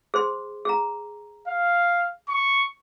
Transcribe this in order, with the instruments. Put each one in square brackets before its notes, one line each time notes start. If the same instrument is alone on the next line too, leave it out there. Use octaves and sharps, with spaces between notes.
[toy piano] G#4 C5 C6
G#4 A#5
[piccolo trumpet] F5
C#6